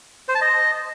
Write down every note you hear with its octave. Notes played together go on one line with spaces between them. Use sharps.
C5
A5
D#5